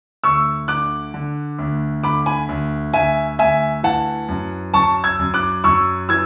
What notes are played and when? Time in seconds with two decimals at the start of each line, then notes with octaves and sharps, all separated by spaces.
0.24 D2 C#6 E6
0.68 D3 D6 F#6
1.14 D3
1.58 D2
2.03 D3 B5 D6
2.26 G#5 B5
2.49 D2
2.94 D2 E5 G#5
3.39 D2 E5 G#5
3.83 E3 F#5 A5
4.29 F#2
4.74 F#2 A5 C#6
5.04 E6 G#6
5.19 F#2
5.34 D6 F#6
5.64 F#2 C#6 E6
6.09 E3 E6 G#6